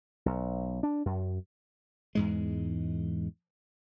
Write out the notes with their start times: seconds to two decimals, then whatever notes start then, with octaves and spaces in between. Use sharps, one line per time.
0.26 B1
0.83 D4
1.06 F#2
2.15 E2 G#2 G#3